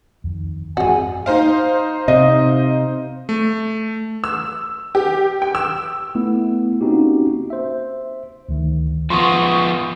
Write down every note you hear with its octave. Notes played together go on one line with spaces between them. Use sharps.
F2 D#3
G2 E3 G#3 C4 F#4 G#5
D#4 C5 F5
C3 D#5
A3
E6
G4
G5
E6
A3 B3 E4
A#3 C4 C#4 D#4 F#4 G4
C5 E5
D2 D#3
F3 B3 C6 C#6 D#6